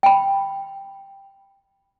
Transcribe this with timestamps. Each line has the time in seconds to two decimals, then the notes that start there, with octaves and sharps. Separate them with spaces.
0.03 G5 B5